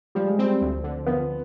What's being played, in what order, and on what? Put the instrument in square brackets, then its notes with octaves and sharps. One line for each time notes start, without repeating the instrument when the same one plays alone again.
[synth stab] F3 [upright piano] G3
[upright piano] G#3
[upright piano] G3 [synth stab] C4
[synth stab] D2
D3
[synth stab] F3 [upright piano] B3